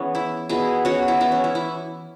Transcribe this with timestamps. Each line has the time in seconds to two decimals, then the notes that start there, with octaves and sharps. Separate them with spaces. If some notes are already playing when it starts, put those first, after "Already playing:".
Already playing: E3 B3 C#4 G#4
0.15 E4
0.49 B2 B3 E4 G#4
0.85 C#4 F#4
1.08 E4
1.20 E3 B3 E4
1.32 C#4
1.44 E4
1.55 E4